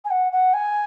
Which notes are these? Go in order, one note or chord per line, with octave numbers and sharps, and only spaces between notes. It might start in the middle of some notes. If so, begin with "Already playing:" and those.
G#5
F#5
F#5
G#5